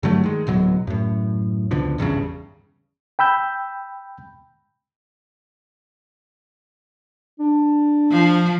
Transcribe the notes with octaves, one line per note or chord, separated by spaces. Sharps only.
G2 D3 F#3 A3
D#3 G#3
D1 B2 F#3
F#2 A2
C#2 B2 D3 F3
G#1 E2 G2 C#3
G5 B5 E6 G6
D4
F3